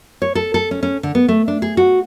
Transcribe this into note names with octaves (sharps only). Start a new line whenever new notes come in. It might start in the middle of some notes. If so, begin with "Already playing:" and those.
C#5
A4
A4
C#4
C#4
D3
B3
A3
D4
G#4
F#4